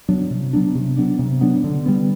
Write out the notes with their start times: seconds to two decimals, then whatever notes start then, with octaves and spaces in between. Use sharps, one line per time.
0.09 F#3 B3 D4
0.30 C3
0.53 F#3 B3 D4
0.75 C3
0.97 F#3 B3 D4
1.19 C3
1.41 F#3 B3 D4
1.64 D3
1.86 G3 B3